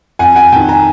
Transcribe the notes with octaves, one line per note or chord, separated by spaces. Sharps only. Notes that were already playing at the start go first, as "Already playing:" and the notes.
F2 F#5 G#5
F#5 G#5
C3 D#3 G5 A5
G#5 A#5